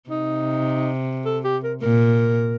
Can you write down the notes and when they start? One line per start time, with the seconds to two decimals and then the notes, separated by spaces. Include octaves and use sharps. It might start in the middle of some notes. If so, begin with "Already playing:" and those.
0.10 C3 D#4
1.25 A4
1.44 G4
1.64 A#4
1.82 A#2 A#4